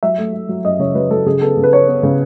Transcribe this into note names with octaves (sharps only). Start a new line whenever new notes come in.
F#3 E5
A3
A3
F#3
F#2 D#5
C#3 C#5
F#3 B4
F#3 A4
C#3 G#4
B3 A4
C#3
B4
B3 C#5
B3
C#3